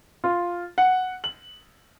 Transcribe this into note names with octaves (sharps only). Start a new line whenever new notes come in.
F4
F#5
F#7